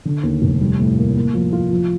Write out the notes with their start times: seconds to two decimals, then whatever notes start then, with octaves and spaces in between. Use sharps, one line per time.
0.05 D3
0.23 D#2
0.42 F1
0.61 G3
0.79 A2
0.97 A#3
1.16 A#3
1.34 F3
1.53 F4
1.71 F3